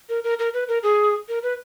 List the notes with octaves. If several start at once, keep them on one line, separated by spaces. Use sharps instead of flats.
A#4
A#4
A#4
B4
A#4
G#4
A#4
B4